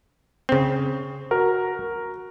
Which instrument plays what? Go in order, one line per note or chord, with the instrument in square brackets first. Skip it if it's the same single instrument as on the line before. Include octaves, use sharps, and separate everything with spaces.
[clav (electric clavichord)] C#3 C4
[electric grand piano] F#4 A#4